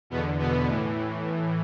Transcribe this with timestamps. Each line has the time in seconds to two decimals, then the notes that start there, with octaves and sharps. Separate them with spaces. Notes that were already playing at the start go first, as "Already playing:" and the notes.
0.10 E2 B2 B3
0.15 D3
0.39 B2 B3
0.68 A2 E3